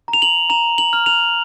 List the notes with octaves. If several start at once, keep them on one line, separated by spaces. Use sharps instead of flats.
A#5
F7
F#7
A#5 F7
F#7
F6
F7